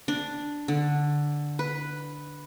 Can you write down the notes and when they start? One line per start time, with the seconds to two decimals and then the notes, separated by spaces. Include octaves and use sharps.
0.08 D4
0.68 D3
1.59 B4